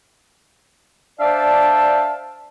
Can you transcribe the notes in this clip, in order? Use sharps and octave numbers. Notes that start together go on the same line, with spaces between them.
D4 C5 D5 E5 F5 A5